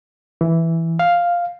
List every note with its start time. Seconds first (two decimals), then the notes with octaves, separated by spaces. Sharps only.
0.41 E3
0.99 F5